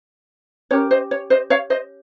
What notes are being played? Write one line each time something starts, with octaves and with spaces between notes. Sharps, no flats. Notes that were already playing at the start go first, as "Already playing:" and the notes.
C#4 G4 A#4 C#5
C5 D#5
C#5
C5 D#5
C#5 F5
C5 D#5